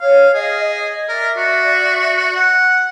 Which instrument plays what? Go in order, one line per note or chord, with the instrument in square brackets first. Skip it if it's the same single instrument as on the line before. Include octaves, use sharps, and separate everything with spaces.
[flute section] C#5 [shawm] F5
[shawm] G#4 [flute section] D#5 F5
[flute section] D#5
[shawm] A#4 [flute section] D5 E5
[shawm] F#4
F#5